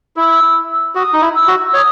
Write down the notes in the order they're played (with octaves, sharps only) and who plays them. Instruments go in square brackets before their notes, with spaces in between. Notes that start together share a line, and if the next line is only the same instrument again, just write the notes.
[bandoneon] E4 [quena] E6
[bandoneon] F#4 [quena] D#6
[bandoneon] D#4
E4
[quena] E6
[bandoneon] F#4
[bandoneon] C#5 [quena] D#6